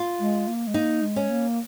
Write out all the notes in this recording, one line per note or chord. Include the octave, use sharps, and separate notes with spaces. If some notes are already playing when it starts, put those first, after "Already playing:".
Already playing: F4
G#3
A#3
G#3
A#3 D#4
G#3
C#4
A#3